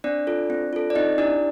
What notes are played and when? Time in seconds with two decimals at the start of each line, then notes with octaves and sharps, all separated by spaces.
0.04 C4 D4 D5
0.27 F4 A4
0.50 C4
0.73 F4 A4
0.90 D5
0.95 C4 D#4 D#5
1.18 D4 E4 G4 D5